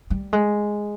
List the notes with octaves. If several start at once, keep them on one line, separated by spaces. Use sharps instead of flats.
G3
G#3